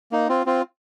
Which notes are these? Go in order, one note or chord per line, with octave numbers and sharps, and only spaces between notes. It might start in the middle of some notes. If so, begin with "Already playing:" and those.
A#3 D#4
C4 F4
C4 F4